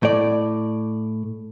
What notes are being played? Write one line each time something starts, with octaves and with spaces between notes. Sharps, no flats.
A2 D5